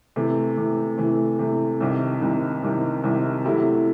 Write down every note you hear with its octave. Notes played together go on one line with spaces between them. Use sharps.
C3 E3 A3
C3 E3 A3
C3 E3 A3
C3 E3 A3
C2 C3 D#3
C2 C3 D#3
C2 C3 D#3
C2 C3 D#3
C3 F#3 A3 E4 G4